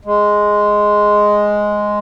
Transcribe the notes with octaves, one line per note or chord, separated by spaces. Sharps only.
G#3